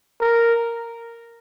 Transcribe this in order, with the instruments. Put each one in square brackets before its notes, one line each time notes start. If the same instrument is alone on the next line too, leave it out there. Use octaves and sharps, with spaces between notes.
[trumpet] A#4